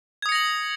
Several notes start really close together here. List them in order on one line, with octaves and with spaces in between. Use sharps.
G#6 D#6 C#7 A#6 F#7